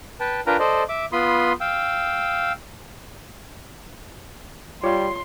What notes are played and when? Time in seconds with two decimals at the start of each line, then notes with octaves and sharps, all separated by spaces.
0.20 B4 G5 A5
0.47 D4 F4 A#4 B4 G5 A#5
0.59 A4 C5 D5 D#5
0.89 E5 D6
1.12 B3 F4 B5 C6 D#6
1.61 F5 G5 E6
4.84 G3 F4 C#5 F5 C6